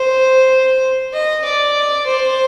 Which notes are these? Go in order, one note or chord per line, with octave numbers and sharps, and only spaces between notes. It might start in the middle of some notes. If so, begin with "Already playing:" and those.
Already playing: C5
D#5
D5
C5